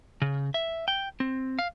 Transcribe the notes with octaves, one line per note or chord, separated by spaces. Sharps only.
C#3
E5
G5
C4
F5